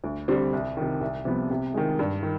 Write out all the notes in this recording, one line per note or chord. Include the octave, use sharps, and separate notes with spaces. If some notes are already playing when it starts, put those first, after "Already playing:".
D2
D3 G3 C4
C2
C3 D#3
C2
C3 F3 B3
C3
D#3 G#3
G2
D#3